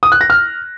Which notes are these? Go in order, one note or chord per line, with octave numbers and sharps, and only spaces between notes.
D#6
F#6
A#6
F6